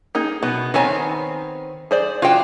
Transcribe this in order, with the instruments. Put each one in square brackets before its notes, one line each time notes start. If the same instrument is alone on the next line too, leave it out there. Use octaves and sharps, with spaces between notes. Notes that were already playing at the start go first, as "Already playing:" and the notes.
[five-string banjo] A#3 D#4 G#4
[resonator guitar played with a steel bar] B2 [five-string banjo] B3
[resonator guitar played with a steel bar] D#3 B3 C4 [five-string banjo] A4 C#5 G#5
[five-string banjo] G#4 C5 D5
[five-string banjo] E3 F#4 G5 [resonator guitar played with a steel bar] D4 F4